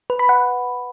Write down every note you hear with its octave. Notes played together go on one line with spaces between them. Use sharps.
B4
B5
F#5